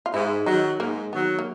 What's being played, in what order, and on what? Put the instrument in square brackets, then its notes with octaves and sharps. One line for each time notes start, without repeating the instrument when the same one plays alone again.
[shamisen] F4
[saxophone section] G#2 [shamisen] E4
[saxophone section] D#3 F#3 [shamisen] D#4
[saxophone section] G#2 [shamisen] A#3
[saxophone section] D#3 F#3 [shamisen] B3
[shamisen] A#3